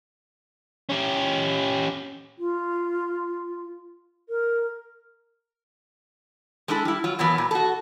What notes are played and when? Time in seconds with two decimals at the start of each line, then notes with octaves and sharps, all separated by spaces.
0.89 C#4 G4
2.38 F4
4.29 A#4
6.68 G#3 A3 D4 E4 A4
6.85 G3 E4
7.04 F#3 F4
7.19 B2 E3 F#3 A#3 B3
7.38 A#2
7.51 F#4 A4